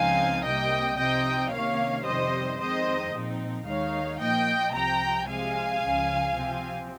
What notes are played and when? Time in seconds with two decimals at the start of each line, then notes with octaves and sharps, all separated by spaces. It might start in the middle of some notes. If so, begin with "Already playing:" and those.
Already playing: C#2 C#3 F3 C4 D#4 F5 G#5
0.45 C2 C3 G3 A#3 D#5 G5
0.98 C3 F3 C4 D#4 D#5 G5
1.52 C3 D#3 A#3 C#4 C#5 F5
2.05 F2 C3 D#3 G3 C5 D#5
2.59 F2 D#3 G#3 C4 D#4 C5 D#5
3.12 A#2 F3 C4 D#4
3.66 D#2 D#3 G#3 D#4 C#5 F5
4.20 A#2 F3 A#3 D#5 G5
4.73 C2 C3 F3 G5 A#5
5.27 C3 F3 G#3 F5 G#5
5.82 C#2 C#3 F3
6.35 C3 F3 C4